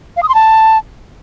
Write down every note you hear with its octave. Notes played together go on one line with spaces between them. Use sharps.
F5
D#6
C6
A5